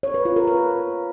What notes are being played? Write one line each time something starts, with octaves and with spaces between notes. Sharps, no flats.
C#5
B4
F4
A#4
B4